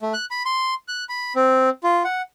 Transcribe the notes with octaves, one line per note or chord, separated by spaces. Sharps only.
A3
F#6
B5
C6
F#6
B5
C4
F4
F#5